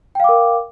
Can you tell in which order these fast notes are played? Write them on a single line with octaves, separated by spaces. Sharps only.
G5 F5 D6 A#4